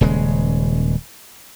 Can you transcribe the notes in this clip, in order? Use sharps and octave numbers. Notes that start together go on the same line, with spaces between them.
D#1 C#3 G#3